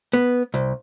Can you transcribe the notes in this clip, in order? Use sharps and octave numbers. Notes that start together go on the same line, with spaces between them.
B3
C2